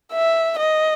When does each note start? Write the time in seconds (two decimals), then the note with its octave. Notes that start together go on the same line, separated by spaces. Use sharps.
0.13 E5
0.58 D#5